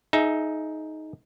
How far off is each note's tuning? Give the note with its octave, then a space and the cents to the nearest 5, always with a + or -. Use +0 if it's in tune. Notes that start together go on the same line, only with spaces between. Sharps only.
D#4 +5 G#4 +30 E5 +0